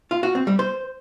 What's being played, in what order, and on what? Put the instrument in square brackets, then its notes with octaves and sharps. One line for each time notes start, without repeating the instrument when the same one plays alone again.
[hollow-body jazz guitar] F4
F#4
C4
G3
C5